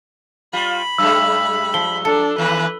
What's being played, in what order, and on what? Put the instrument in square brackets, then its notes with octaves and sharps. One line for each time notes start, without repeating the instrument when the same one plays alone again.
[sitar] G3 F4 [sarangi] B5
[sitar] F#2 G3 G#3 [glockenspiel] E6
[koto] F3 [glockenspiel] G7
[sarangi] D4 [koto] A4
[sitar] D#2 E3 [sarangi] B4